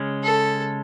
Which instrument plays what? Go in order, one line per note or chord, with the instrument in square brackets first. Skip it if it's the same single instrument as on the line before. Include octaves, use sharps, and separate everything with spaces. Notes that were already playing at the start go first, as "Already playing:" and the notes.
Already playing: [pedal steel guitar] C#3 G#3 C#4
[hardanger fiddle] A4